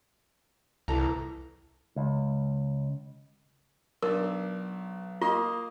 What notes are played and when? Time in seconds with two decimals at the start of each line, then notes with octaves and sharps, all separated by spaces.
0.88 C2 E3 A4 A#5
1.96 C#2
4.02 B1 D4 A#4
5.21 A#3 F4 D#5 C6